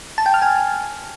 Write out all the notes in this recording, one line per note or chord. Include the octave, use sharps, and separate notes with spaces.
A5
G5
F6
G#5